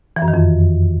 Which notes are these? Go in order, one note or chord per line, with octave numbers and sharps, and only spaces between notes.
E3
F#2
D#3
F2